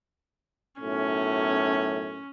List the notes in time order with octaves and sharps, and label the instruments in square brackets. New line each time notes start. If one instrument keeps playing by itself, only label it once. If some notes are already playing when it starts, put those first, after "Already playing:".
[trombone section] B1 F#2 A2 [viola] C#4